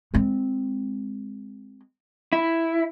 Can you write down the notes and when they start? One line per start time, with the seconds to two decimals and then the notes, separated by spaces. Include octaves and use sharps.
0.14 G#3 C4
2.33 E4